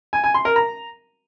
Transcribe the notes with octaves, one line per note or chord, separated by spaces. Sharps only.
G#5
G#5
C6
A#4
A#5